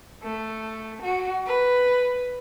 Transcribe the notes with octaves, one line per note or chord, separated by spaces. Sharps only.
A3
F#4
B4